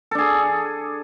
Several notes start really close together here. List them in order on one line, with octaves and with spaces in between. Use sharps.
A4 D4 G#4